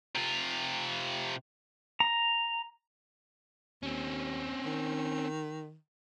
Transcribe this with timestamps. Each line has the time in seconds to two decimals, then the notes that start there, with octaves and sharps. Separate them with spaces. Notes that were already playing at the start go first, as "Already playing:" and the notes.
0.15 C3 F4
2.00 A#5
3.83 D#2 C4 C#4
4.65 D#3